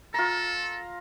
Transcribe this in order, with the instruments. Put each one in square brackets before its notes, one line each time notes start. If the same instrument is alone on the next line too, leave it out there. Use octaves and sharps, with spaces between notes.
[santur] F4 A#5 [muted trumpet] A4